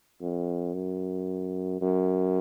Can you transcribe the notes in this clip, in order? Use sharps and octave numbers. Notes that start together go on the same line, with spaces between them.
F2
F#2
F#2